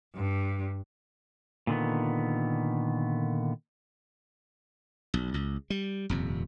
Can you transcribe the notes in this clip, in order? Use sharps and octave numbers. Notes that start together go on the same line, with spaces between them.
G2
A#2 D3 D#3 B3
B1
C#2
G3
D#1 F2 C3